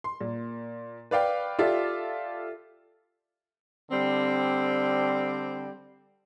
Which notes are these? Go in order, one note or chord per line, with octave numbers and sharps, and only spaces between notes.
C6
A#2
B4 D5 F5 G5
F4 G4 A4 D5 E5
D3 G3 C4